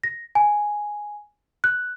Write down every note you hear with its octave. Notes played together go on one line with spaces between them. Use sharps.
A#6
G#5
F#6